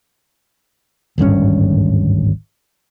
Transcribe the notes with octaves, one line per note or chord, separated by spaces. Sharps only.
D1 G#1 G2 C#4